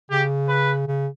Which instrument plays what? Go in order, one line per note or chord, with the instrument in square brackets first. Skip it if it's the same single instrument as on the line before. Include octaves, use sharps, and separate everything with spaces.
[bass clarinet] C#3 [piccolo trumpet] G4
[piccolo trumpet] B4
[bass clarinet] C#3